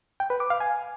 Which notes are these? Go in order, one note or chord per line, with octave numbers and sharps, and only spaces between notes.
G5
B4
D6
F5
G#5